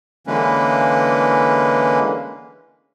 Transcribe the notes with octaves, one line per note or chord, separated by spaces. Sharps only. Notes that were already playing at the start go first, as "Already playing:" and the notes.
D3 E3 G#3 A#3 C#4 B4